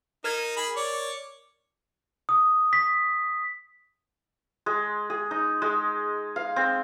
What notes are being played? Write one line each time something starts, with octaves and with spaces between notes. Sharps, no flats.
D#4 A#4 F6 G#6
G#4 B5
C#5 D5
D#6
B6
G#3
G#4
D#4
G#3
F5
C4